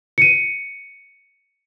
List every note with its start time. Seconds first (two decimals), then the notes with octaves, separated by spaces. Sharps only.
0.18 C#7 D#7